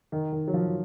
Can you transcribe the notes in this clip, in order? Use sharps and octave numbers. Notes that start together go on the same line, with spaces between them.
D#3
D#3
F#3
F3